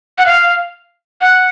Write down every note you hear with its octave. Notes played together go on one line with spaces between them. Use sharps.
F#5
F5
F#5